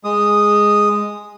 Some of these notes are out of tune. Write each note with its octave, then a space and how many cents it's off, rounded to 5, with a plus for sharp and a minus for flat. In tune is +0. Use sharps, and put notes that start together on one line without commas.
G#3 +0 D#6 -5